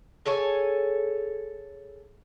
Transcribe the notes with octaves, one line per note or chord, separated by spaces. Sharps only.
G#4 A4 C#5 G#5